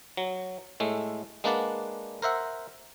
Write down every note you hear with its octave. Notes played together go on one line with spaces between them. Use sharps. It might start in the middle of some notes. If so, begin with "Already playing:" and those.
F#3
A2 G#3 A3
G#3 A#3 D4 B4 D5 F#5
A#4 C5 E5 F#5